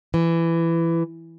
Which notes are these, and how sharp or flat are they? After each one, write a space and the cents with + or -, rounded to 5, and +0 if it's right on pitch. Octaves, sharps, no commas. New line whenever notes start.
E3 +15